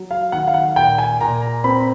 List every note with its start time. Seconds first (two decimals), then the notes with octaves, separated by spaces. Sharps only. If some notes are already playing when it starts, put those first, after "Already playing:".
Already playing: F#3
0.11 F5
0.32 D#3 F#5
0.47 F5
0.54 F#5
0.76 A#2 G5
0.98 G#5
1.21 A#2 A#5
1.42 A#5
1.64 C4 B5